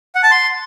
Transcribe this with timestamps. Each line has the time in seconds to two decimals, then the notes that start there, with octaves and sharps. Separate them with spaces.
0.15 F#5
0.23 A5
0.31 C6